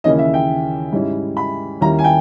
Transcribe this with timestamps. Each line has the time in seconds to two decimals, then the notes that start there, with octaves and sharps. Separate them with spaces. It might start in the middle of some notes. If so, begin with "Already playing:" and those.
0.04 D#2 C#3 E3 A#3 C#4 D#5
0.19 E5
0.34 G5
0.92 G#2 G3 C#4 E4
1.37 B5
1.81 D#2 D#3 G3 C#4 E4 A#5
1.99 G#5
2.04 G5